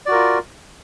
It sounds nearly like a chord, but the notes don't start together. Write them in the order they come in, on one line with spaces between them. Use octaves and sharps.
D5 F#4 A#4 F4